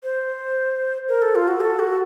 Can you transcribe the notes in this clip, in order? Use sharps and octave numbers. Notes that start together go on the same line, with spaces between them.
C5
A#4
A4
F4
F#4
A4
F#4